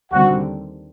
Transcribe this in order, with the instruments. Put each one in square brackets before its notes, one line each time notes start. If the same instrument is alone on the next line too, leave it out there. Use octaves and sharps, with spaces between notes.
[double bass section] D#2 D3 G3 C4 [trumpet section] F#4 F#5